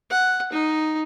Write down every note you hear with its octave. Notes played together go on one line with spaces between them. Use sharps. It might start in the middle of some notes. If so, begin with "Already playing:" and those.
F#5
D#4